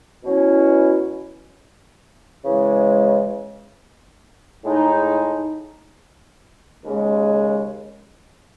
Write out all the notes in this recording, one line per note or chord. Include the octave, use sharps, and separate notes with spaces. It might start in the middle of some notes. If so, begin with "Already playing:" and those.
B2 F#3 C#4 E4
C#3 E3 G#3
A2 G#3 D#4
D#2 C#3 G#3